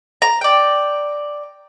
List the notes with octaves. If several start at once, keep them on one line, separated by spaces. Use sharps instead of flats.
A#5
D5 G5